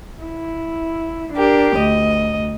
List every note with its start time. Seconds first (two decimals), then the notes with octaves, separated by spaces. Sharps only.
0.22 E4
1.33 D4 G4 A#4
1.78 D2 D#5